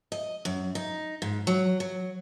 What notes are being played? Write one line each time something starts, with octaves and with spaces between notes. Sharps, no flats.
D#5
F#2
D#4
G#2
F#3
F#3